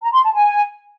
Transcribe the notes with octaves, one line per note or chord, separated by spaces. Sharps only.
A#5
C6
A5
G#5